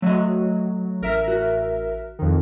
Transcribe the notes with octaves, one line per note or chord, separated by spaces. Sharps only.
F#3 A3 D#5
A1 A#4 E5
F#4
F2 D#3